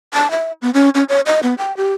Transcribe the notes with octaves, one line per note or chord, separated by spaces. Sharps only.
A5
E5
B3
C#4
C#4
C#5
D#5
B3
G5
G4